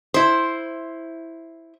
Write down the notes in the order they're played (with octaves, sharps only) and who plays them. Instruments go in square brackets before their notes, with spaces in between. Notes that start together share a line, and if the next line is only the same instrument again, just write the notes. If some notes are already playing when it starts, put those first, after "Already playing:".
[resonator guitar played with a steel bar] E4 C5